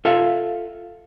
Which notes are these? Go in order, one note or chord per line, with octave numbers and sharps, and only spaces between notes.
F4 A4 E5 F5